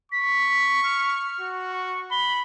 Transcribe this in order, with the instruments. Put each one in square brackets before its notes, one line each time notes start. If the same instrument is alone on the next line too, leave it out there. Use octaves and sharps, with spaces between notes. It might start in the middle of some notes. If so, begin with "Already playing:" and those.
[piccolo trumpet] C#6 [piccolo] B6
[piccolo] F6
[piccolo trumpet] F#4
[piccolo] C#6
[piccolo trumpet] B5 [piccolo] G7